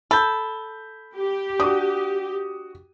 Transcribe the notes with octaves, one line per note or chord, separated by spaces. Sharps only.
A4 B5 G6
G4
D4 F#4 D#6